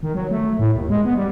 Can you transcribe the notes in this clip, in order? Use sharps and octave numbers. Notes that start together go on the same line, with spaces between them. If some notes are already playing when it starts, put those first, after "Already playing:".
D#3
F#3
A3
A2
D#2
G#3
B3
G3